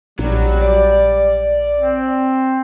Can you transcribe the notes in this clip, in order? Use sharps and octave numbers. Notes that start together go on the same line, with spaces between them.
A#1 F#3 G3
D5
C4